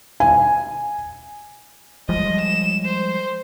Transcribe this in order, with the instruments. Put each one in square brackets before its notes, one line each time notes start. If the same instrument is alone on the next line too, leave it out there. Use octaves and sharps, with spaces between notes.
[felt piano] G#5
[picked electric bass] F3 G3 G#3 [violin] D#5
[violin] E7
C5